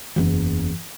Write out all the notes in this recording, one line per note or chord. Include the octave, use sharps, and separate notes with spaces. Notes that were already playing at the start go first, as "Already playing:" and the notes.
F#1 E2